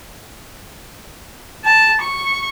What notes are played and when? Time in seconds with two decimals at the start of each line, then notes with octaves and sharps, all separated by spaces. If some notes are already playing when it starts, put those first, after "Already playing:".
1.65 A5
2.02 C#6